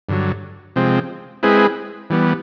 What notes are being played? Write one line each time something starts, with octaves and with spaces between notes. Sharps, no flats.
G2 D3 F#3
C3 F3 G#3 C4
G#3 C4 E4 G#4 B4
E3 G3 B3